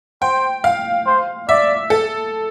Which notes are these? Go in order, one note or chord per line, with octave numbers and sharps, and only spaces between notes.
C5 G5
F5
C5
D5 E5
A4